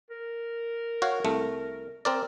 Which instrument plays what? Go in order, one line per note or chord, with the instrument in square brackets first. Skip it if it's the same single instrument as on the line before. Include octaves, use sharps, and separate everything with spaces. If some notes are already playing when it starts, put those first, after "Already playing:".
[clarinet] A#4
[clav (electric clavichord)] F#4 C#5 F5
C2 A3
C4 A#4 D5